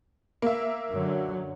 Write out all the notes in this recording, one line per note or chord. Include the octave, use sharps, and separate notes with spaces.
A#3 E5
F#2 D3 F#3